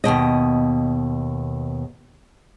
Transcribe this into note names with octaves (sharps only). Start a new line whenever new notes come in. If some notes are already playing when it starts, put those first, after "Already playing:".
D#2 G#2 B2 D#5